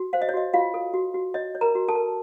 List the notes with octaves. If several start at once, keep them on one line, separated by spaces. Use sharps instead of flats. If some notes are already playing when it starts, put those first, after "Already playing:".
Already playing: F#4
C5 F5
D#5
C#5
F#4 D#5
F4 F#4 F5
A4
F#4
F#4
C#5 D#5
C#5
A#4 A#5
F#4
A4 A5
A#4